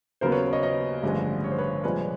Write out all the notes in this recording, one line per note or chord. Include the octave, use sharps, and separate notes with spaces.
D#2 C#3 F#3 B3 A#4 C5
B4 C#5
C#5 D#5
C#5 D#5
A1 G2 D3 F3 G#3
C#5
C5
B4 C#5
C2 A#2 F3 G#3 B4 C#5